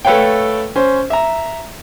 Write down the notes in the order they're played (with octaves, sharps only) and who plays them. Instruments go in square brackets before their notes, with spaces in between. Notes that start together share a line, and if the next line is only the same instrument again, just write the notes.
[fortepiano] A3 A4 B4 C#5 F5 G5
C#4 C5
E5 A#5